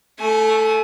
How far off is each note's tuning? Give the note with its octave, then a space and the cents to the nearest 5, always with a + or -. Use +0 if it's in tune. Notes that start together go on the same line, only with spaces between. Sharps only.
A3 +0 G#5 +40